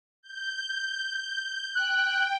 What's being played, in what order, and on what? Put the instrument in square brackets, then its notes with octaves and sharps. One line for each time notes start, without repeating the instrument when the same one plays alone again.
[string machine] G6
[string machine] G5 [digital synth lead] F#6